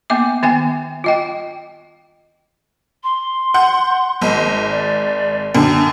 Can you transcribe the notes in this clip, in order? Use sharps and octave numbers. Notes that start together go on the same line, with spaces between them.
A#3 B3 E5 D6
D#3 B3 E5 G5 G#5
F4 D#5 G5
C6
F#5 G6
G#1 D#5
D5
F#2 D3 G5